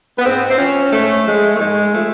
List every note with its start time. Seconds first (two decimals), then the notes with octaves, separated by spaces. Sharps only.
0.17 B3
0.24 G#2 C4
0.50 C4
0.58 F3 C#4
0.92 G#2 A3
1.25 F3 G#3
1.56 A3
1.60 G#2 G#3
1.93 F3 A3